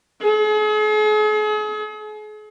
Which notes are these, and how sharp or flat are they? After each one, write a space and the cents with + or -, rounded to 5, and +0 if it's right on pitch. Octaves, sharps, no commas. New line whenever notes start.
G#4 +40